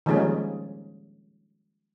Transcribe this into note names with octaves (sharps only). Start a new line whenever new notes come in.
D#3 F3 G3 G#3 A#3 C#4